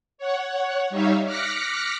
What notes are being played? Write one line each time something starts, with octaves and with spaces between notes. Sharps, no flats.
C#5 F#5
G3 D#4 C#5 E5 F5
D6 F6 F#6 A#6 B6 C#7